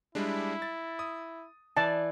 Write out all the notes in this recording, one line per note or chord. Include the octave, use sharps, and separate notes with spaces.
G3 G#3 D4 E4
A6
D#6
E3 D5 A5